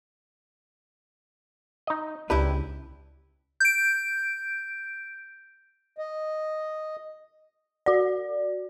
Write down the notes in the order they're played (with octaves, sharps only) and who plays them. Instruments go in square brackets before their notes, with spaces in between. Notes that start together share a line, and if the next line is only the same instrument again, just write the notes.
[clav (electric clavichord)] D#4 D#5
[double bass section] C#2 [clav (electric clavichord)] D4 [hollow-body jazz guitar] E4 G4 B4
[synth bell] G6 D7
[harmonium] D#5
[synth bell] F#4 D5